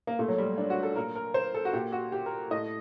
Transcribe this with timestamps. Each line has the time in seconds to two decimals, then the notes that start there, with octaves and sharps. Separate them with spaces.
0.07 A#3
0.19 A#2 A3
0.28 F#3
0.38 G3
0.58 D4
0.70 F#4
0.83 A4
0.96 A#2 A#4
1.15 A#4
1.34 C5
1.54 A4
1.65 F#4
1.73 A#2 G4
1.92 F#4
2.12 G4
2.26 A#4
2.51 A2 D#5